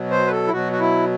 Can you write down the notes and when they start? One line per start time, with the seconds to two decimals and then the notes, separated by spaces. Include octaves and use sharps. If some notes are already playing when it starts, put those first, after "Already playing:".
Already playing: B2 F#3
0.11 C5
0.27 B4
0.31 A4
0.47 E4
0.52 B2 F#3 F#4
0.73 F#4
0.80 E4